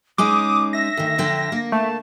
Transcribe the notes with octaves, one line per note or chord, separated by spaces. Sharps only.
G#3 C#4 D#4 D6 D#6
E5 A#6
D2 D#3
F2 D3 G5
A#3
A3 A5